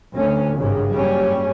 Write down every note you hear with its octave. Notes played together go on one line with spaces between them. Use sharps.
D2 C#4
G#1 G2 C#3
F#1 G3 C#4